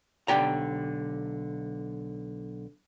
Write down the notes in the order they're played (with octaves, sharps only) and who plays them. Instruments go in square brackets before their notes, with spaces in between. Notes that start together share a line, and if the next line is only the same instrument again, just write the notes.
[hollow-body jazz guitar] B1 D3 G4 A#5